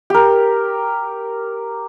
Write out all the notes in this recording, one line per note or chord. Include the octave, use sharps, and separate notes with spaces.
G4 A#4